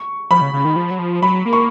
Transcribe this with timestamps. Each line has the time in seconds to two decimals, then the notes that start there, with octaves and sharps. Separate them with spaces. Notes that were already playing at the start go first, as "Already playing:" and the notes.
Already playing: C#6
0.30 F3 B5
0.41 C#3
0.53 C#3
0.65 D#3
0.76 F3
0.91 F#3
0.99 F3
1.22 F#3 B5
1.45 A#3
1.53 C#6